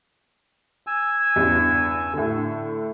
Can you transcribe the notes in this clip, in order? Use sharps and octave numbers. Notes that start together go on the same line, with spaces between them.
G#5 E6
E2 G2 C#3
A2 D3